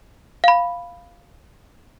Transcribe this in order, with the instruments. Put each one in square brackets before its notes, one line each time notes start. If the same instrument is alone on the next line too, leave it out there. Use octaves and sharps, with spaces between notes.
[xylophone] F5 B5